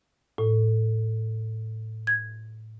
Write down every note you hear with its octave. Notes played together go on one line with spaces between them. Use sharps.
A2
G#6